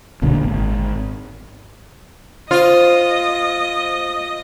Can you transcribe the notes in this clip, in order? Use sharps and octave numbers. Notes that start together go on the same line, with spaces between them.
E1 B1 A#2 D3
G#1
F4 C5 D#5